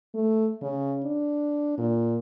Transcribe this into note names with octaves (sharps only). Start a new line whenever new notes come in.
A3
C#3
D4
A#2